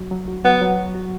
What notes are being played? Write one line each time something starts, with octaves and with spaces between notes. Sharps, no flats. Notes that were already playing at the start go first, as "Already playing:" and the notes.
Already playing: F#3 F#4
F#3
F#4
F#3 B3
F#3
F#4
F#4